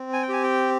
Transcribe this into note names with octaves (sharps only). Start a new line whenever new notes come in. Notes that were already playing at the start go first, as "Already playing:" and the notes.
Already playing: C4
G#5
G5
G4 G#5
G5